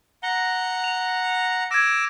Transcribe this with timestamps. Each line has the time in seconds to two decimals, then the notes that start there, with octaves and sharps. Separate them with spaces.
0.23 F#5 A#5 G7
0.84 F7
1.71 D6 E6 G#6 A#6